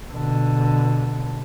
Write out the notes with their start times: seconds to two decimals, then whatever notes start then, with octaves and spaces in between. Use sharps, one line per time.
0.11 B2 D3